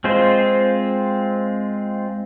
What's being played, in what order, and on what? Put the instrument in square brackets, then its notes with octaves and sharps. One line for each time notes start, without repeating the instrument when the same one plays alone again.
[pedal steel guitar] G#3 C4 F4 C5